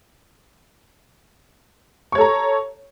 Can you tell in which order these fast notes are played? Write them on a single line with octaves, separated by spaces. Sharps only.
C#6 C#5 A4 A#5